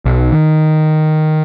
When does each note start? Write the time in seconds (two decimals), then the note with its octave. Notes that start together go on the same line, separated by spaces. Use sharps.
0.05 B1
0.32 D#3